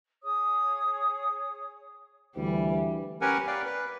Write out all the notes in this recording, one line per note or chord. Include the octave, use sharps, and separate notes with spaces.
G#4 C#5 D#6
D2 E3 G3
C#4 G4 A#4 B4 F#5 G#5
B4 D5 F5 G5
B4